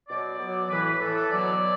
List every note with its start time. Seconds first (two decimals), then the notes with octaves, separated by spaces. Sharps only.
0.09 B2 F#3 D5
0.40 B2 F#3
0.69 A2 E3 B4
0.85 B4
1.00 A2 E3 A4
1.15 A4
1.30 B2 F#3 D5
1.61 F#3